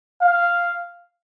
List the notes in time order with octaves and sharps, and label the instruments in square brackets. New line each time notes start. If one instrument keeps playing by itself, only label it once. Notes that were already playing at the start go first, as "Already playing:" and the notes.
[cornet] F5